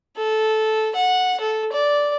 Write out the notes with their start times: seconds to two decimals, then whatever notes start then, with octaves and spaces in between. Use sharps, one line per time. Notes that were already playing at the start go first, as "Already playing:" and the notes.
0.17 A4
0.95 F#5
1.40 A4
1.72 D5